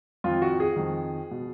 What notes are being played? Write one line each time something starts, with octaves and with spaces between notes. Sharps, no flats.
F2 D#3 F4
F#4
G#4
F2 D#3
B2